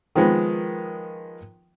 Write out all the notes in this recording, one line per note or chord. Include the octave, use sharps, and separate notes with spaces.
D#3 F3 G#3 B3